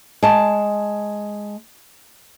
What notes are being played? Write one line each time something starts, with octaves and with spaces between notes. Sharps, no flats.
G#3 A5